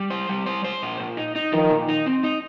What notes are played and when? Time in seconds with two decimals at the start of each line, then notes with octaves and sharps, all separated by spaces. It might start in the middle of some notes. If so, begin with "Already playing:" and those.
Already playing: G3
0.10 C5
0.29 G3
0.46 C5
0.64 C5
0.82 A#2
1.00 A#2
1.17 D#4
1.36 D#4
1.52 D#3 F3
1.71 A#2
1.88 D#4
2.06 C4
2.23 D#4